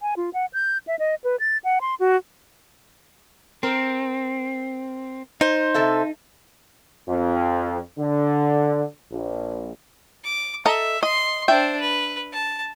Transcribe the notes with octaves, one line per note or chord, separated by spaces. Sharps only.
G#5
F4
F#5
G6
E5
D#5
B4
A6
F#5
C6
F#4
C4 A#4
D#4 C5
C3 A4 E5
F2
D3
A#1
D6
A4 D#5 E5 A#5
D#5 C6
D4 C5 E5 G5
B4
A5